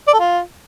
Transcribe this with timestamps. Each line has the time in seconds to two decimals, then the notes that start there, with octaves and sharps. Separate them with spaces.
0.08 D5
0.14 A4
0.20 F4